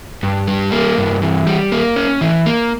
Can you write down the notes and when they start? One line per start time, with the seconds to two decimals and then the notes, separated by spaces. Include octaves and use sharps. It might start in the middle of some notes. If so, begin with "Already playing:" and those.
0.23 G2
0.47 G3
0.72 A#3
0.97 G2
1.22 E3
1.47 G3
1.72 A#3
1.96 C#4
2.21 E3
2.46 A#3